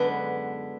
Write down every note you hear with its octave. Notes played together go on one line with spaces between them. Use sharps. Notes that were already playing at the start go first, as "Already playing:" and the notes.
Already playing: F#2 D3 G#3 B3 D4